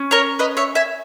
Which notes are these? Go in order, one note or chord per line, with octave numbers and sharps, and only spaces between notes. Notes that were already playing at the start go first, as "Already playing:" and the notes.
Already playing: C#4
A#4 C#5
B4 D#5
C#5 E5
E5 G#5